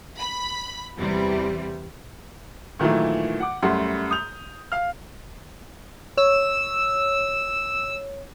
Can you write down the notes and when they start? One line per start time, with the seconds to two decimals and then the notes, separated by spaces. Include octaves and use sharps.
0.18 B5
0.98 E2 C3 E3 G3
2.80 A#2 D#3 E3 F#3 A3
3.40 F#5 D6
3.62 F#2 G3 A3 F#5 C6
4.11 D#6 G6 F7
4.72 F5 F6
6.17 C#5 E6